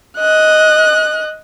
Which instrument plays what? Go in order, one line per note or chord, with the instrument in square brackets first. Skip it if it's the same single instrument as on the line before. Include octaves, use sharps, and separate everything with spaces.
[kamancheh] D#5 F#6